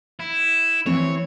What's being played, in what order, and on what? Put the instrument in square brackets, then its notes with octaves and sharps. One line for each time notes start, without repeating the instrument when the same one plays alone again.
[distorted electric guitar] E4
[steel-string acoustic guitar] E3 C4 C5 [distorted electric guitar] C#5